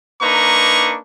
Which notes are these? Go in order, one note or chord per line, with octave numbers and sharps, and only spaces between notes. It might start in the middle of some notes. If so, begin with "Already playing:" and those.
A#3 D4 D#4 B4 A#5 C#6